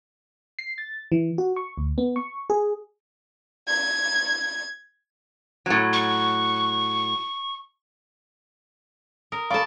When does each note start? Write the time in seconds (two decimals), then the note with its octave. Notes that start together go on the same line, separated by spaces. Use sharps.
0.59 C7
0.78 A6
1.12 E3
1.38 F#4
1.56 C#6
1.77 D2
1.98 B3
2.16 C#6
2.50 G#4
3.66 G#6
5.66 A2 F#3
5.93 C#6
9.32 A#4 D#6
9.50 A4 D5 F5 A5 B5 C#6